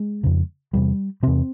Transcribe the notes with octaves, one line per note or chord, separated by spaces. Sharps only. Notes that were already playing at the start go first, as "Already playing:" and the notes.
Already playing: G#3
F2 C#3
E2 C3 G3
E2 C3 C4